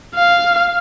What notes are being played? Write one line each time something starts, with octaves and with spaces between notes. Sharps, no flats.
F5